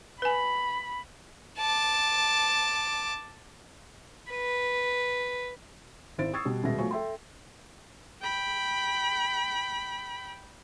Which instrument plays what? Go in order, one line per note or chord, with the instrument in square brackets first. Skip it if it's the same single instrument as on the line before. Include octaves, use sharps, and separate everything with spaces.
[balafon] B4 G#5 [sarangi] B5
[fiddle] A5 D6
[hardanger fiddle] B4
[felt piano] G#1 E4 C5 A6 D7
C#6 D#6 E6 G#6 A6 C7
B2 G3
D#1 B2 G#3 B3 E5 A#6
F3 F#3 A3 G#5 C#6
A4 E5 G5 C6
[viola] G5 B5